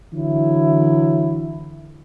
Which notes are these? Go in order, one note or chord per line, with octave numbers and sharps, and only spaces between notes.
D3 E3 F#3 E4